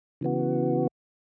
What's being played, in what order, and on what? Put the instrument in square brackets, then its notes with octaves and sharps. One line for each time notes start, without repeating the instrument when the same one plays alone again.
[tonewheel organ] C#3 E3 B3 F#4